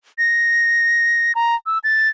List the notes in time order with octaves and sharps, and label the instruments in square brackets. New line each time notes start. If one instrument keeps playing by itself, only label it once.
[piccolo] A#6
A#5
E6
A6